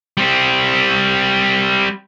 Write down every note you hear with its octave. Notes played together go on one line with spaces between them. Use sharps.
G3 C4